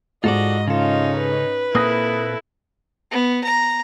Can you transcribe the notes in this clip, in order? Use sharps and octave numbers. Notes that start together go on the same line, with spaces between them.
G#2 F4 F#4 A4 D5 D#5
C#3 C#4 D#4 F4 A4
B4
A#2 A#3 C4 E4 A4 D#6 F#6 A#6
B3
A#5